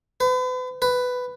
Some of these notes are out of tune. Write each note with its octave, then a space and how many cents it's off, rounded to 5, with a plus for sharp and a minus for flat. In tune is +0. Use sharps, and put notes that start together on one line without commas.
B4 +40
B4 +10